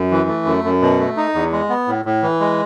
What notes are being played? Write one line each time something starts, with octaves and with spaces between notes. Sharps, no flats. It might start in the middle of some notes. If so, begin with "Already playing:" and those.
Already playing: F#2
E3
A3
F#2
F#2
B2
A3
D#4
E2
G#3
B3
A2
A2
E3
G#3